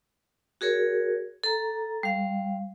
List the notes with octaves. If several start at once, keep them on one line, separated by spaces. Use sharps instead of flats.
F#4 G#4 A#4 C#5
A4 A#5
G3 F5